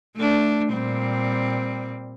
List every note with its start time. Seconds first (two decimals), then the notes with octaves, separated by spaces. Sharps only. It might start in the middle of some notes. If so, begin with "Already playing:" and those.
0.16 A3 D4
0.71 A#2 G3 C4